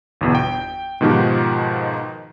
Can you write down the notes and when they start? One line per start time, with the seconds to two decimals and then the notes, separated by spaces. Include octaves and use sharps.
0.21 G1 E2 B2
0.35 G5
1.01 G#2 B2 D#3 F3 F#4 G4